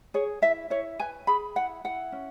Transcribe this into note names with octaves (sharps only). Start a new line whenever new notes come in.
G#4 C#5
E4 E5
E4 C#5
B4 G#5
G#4 B5
E4 F#5
E4 F#5
C#4